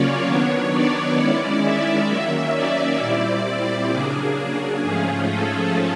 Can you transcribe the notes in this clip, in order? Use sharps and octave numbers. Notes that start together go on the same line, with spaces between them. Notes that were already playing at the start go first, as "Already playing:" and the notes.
Already playing: C#3 F#3 A#3 C#4 F4 C#5 D5
D#3 F#3 B3 D4
D5
D#3 G#3 C#4 E4
E5
D#3 F#3 A#3 C#4
D5
A#2 G3 C4 E4
C#3 F#3 A#3 D4 G#4
G#2 F3 A3 C#4 F4 G#4
A4